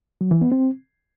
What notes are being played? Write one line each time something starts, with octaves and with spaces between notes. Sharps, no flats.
F#3
E3
B3
C4